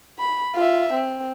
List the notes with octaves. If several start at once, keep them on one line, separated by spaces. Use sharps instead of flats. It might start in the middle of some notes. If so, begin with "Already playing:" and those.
B5
F4 E5
C4